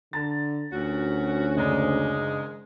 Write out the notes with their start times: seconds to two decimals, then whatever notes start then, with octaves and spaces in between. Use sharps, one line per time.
0.13 D3 A5 A#5 A6
0.72 D2 A#2 C#4 F#4
1.56 F#1 D#3 G#3 D4 A#5